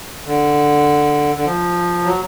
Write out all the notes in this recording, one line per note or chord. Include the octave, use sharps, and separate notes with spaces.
D3
D3
F3
F#3